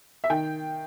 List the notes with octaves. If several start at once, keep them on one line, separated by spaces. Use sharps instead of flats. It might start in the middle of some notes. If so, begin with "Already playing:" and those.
E5
D#3 G5